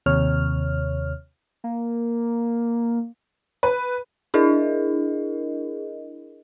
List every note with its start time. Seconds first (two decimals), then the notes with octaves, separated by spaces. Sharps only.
0.06 D#2 C3 C#5 F6
1.64 A#3
3.63 B4
4.34 D4 E4 G#4 A#4 D#5